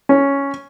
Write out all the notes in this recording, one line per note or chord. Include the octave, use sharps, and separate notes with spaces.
C#4